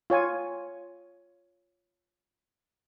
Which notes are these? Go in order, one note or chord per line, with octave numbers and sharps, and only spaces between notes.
F4 C#5 G#5